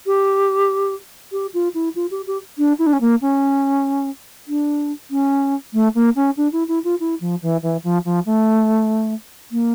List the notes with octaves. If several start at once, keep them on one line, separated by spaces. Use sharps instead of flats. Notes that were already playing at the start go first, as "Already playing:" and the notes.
G4
G4
F4
E4
F4
G4
G4
D4
E4
D4
C#4
A#3
C#4
D4
C#4
A3
A#3
C#4
D4
E4
E4
F4
E4
F3
E3
E3
F3
F3
A3
A#3